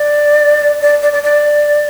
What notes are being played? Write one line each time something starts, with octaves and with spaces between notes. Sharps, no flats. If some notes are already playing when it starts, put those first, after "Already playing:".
Already playing: D5
D5
D5
D5
D5